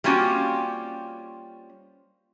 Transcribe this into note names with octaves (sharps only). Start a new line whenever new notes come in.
G3 A#3 C4 C#4 F4 F#4